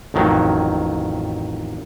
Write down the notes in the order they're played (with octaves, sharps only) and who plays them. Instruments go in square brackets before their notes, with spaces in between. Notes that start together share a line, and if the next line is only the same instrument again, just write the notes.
[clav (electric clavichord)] A1 F2 D#3 F#3